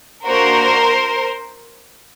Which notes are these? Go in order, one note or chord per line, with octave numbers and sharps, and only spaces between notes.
A#3 D4 F#4 A#4 C5